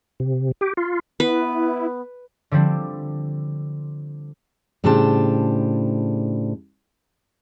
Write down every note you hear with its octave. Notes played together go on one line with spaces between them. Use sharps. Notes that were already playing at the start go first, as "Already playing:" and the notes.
C3
G4
F4
B3 E4 B4
D3 F3 G3 C4 D4
A2 C#3 G3 D4 C5 A5